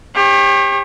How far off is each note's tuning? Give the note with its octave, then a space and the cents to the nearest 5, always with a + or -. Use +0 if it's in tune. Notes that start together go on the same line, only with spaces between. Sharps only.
G4 +25 C#5 -35